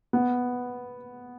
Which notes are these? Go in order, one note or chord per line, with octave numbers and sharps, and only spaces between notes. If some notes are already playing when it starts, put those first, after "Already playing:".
B3